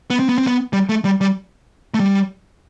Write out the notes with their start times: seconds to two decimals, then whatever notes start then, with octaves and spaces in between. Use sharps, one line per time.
0.10 B3
0.19 C4
0.29 B3
0.38 C4
0.47 B3
0.73 G3
0.89 A3
1.05 G3
1.21 G3
1.94 A3
2.00 G3